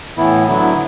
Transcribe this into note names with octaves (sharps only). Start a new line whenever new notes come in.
A2 E3 B3 E4
D3 F#3 B3 E4